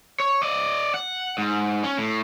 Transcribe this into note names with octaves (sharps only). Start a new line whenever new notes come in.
C#5
D5 D#5
F#5
G#2
C#4
A2